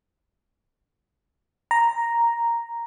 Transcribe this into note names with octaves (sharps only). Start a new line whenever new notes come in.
A#5